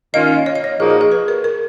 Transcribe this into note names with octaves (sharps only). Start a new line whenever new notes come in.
D#3 A#3 C#4 F4 D#5
C#5
D#5
C#5
A#2 F3 A#3 D#4 F#4 G#4
G#4
G#4
B4
A#4
A#4